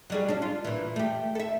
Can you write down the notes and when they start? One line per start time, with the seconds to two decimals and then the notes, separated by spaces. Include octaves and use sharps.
0.10 F#3 G3 G#4
0.28 C#4 D4
0.42 F4
0.65 A#2 E3
0.96 A3 G4
1.35 A4 E5